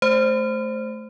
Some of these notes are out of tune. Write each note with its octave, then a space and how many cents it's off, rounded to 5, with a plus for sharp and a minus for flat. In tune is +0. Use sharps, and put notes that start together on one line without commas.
A3 -15 C5 +0